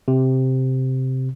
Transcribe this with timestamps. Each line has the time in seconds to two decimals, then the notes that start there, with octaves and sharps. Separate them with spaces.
0.08 C3